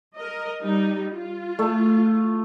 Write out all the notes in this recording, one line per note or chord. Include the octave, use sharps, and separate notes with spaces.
A#4 D#5
G3 D#4
F4
A3